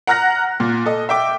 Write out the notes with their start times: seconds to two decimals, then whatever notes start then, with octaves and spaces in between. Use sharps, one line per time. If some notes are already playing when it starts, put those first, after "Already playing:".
0.07 F#5 A#5 F6 F#6 A#6
0.60 A#2
0.86 A4 D#5
1.09 E5 G5 D6